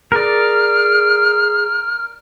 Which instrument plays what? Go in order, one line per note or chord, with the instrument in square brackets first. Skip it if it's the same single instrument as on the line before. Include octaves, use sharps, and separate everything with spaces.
[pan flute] G#4 [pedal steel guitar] A#4 D5 [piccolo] F6